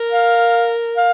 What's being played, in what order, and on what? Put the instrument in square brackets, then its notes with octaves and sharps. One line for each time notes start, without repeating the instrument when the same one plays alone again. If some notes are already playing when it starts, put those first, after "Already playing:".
Already playing: [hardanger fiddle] A#4
[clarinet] F5
F5